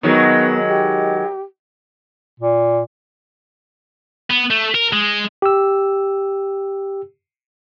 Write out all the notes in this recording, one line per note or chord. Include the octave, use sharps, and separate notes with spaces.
D#3 F#3 G#3 B3
G4
A#2
B3
A3
A#4
G#3
G4 E6